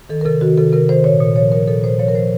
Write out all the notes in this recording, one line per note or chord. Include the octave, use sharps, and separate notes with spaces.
D#3 A4
A#4
C3 A4
D#3 F#4
C3 A4
C3 A#4
D#3 C5
A#2 C#5
A#2
F3 C#5
A#2 A#4
A#2 A4
A#2 C5
F3 C#5
A#4
F3 C5